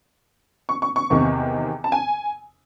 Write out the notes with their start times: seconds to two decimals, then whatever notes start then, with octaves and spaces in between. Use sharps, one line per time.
0.69 C#6
0.82 C#6
0.96 C#6
1.10 E2 C3 D#3
1.84 A5
1.92 G#5